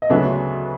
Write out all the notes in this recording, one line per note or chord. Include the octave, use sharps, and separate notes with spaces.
D#5
D2 C#3 F#3 B3 D4 E5